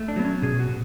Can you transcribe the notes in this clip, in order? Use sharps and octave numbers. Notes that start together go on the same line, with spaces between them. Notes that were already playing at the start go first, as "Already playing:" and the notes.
Already playing: A3
D4
F#3 B3
C#4
B2 G#4
F#4
B2